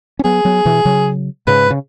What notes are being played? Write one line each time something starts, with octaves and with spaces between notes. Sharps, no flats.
C#4
F#3 B3 G#4
F#3 B3
B2 E3
C#3 F#3
G#2 C#3 B4
C#3